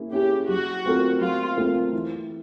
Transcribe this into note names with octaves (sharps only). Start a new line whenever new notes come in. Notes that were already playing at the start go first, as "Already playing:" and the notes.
Already playing: A#3 C#4 E4 G#4
C#4 E4 G4 G#4
F#3 F#4
A3 C4 F4 A#4
F#3 F4
A3 C4 F4 A#4
E3